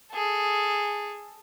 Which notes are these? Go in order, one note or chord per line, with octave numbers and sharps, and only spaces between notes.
G#4 A4